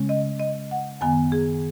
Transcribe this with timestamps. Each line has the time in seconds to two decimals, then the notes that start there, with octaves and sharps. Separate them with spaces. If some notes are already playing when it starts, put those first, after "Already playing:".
Already playing: C#3 G#3 C#4
0.09 D#5
0.39 D#5
0.71 F#5
1.01 F#2 D#3 B3 G#5
1.32 G#4